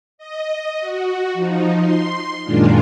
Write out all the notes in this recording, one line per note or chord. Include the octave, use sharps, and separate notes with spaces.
D#5
F#4
F3 D#4
C6
F#2 A#2 D#3 G#3 D4 F4